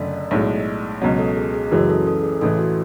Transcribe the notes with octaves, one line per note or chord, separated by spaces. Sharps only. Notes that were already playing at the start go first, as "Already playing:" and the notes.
Already playing: F#1 F#2 D3 A3 D5
B1 A2 G#3
C#2 B2 F#3 C#5
A4
G#4
G#4
F#1 F#2 C#3 E3 G#3 F#4
A4
A4
G#4
A1 A2 E3 A4
F#4